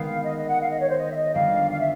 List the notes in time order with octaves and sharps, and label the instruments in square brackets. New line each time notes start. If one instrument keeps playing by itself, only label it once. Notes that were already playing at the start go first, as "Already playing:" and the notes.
Already playing: [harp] D#3 G#3 B3 [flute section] F5
[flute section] D#5
D#5
F#5
F5
D#5
C#5
C5
D#5
E5
D#5
[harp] F2 D3 G3 [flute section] F5
[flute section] F5
E5